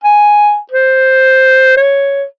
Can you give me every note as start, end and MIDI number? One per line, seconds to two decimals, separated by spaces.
0.03 0.58 80
0.71 1.76 72
1.77 2.25 73